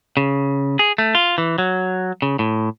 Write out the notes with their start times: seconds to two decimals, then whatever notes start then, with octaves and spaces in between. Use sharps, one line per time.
0.17 C#3
0.79 G#4
0.98 A3
1.15 F4
1.38 E3
1.58 F#3
2.22 C#3
2.39 A2